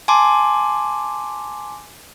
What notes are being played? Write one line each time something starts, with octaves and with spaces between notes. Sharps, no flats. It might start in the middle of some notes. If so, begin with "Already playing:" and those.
G#5 A5 C6 D6